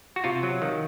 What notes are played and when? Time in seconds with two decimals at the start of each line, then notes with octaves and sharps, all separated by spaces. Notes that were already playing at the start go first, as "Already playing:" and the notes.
0.16 F#4
0.24 C3 F4
0.43 F#3
0.62 D#3